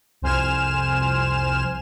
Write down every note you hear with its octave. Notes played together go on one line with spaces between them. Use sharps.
C2 F2 C5 G#5 F6 E7